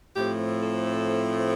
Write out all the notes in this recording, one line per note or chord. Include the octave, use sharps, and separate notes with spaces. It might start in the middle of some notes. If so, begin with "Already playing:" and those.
A2 F3 A3 C4 G4
A4